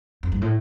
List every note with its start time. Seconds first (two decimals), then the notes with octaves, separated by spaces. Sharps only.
0.23 F2
0.32 G2
0.42 A2